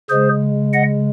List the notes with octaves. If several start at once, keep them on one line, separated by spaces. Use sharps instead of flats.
C#3 G#3 G#4 C5
D#5 F#5